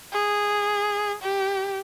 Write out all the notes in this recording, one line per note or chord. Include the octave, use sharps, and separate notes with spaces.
G#4
G4